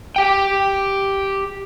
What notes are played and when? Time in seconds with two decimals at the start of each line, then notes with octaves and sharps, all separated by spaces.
0.16 G4 G5